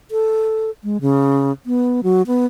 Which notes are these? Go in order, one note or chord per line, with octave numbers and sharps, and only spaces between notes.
A4
G#3
C#3
B3
F#3
B3